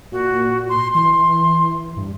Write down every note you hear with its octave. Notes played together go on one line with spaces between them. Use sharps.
A#2 F#4
C6
E3 C6
G2